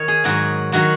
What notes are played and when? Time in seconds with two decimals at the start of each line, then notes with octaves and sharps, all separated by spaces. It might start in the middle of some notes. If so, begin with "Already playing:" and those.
Already playing: D#3 A#4 C#5
0.08 G#4
0.24 G#2 D#3 F#3 F#4
0.72 D#3 F#3 F#4